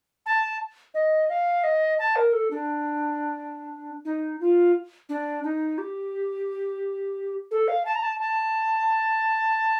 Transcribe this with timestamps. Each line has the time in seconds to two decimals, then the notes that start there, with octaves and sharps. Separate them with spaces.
0.26 A5
0.94 D#5
1.29 F5
1.63 D#5
1.99 A5
2.16 A#4
2.33 A4
2.51 D4
4.05 D#4
4.40 F4
5.09 D4
5.44 D#4
5.78 G4
7.51 A4
7.68 F5
7.86 A5
7.95 A#5
8.02 A5
8.20 A5